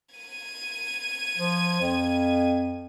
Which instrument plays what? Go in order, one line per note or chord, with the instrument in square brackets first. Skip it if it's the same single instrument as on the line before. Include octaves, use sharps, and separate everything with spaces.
[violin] G#6 D#7
[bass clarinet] F3
F2